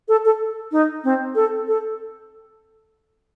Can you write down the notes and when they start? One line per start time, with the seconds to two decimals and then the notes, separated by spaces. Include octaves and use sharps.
0.08 A4
0.25 A4
0.72 D#4
1.04 C4
1.35 A4
1.68 A4